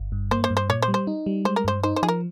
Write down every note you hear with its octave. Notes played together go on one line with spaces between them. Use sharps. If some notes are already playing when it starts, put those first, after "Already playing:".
Already playing: G1
G2
A#3 C5
C5
G2
C5
A#2 C#5
C5
G3
C5
D#4
G3
G#3 C5
A#4
G2 C5
D#4 C5
C5
F3 G#4
A#4